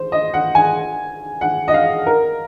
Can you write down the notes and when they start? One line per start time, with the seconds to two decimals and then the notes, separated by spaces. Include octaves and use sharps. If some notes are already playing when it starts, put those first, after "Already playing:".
Already playing: C5
0.12 D#5
0.34 F#5
0.55 G#5
1.41 F#5
1.68 D#5
1.74 F5
2.07 A#4